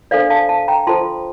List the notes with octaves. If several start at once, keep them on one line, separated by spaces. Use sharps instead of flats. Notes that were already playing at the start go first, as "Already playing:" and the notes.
D4 A4 C5 D5 F5
F5 A5
F5 A5
G5 A#5
F4 A4 C5 A5 C6